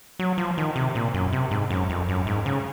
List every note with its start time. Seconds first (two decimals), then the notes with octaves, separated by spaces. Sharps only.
0.19 F#3
0.38 F3
0.58 D#3
0.76 C3
0.95 A#2
1.14 F#2
1.33 C3
1.51 G#2
1.71 F#2
1.90 F2
2.09 F#2
2.27 G#2
2.46 C#3